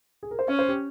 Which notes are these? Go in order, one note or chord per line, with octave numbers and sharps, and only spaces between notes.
G#4
A#4
C5
C#4 C#5
C5
G4